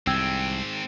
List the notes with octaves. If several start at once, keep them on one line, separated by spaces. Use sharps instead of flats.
C2 G#2 C4 G5 E6 G#6